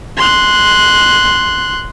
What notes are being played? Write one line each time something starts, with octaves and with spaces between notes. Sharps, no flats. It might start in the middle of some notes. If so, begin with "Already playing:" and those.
C6 F#6